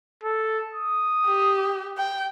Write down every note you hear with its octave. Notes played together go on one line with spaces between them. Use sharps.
A4
D#6
G4
G5